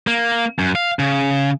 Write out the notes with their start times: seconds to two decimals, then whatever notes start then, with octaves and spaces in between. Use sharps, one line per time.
0.07 A#3
0.59 F#2
0.75 F5
0.99 C#3